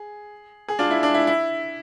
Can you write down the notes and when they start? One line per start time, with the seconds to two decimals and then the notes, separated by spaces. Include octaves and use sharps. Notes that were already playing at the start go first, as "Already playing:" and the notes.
Already playing: G#4
0.68 G#4
0.79 D4 F4
0.91 E4
1.03 D4
1.14 E4
1.27 E4